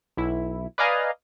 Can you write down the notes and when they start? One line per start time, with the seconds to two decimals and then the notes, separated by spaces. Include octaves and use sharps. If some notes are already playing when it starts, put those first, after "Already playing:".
0.17 B1 E4
0.78 B4 D5 D#5 F5 G#5 A#5